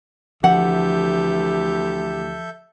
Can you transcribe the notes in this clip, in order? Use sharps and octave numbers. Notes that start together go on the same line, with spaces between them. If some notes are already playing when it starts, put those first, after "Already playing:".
D2 E3 F3 G4 A4 E5 F#5 G6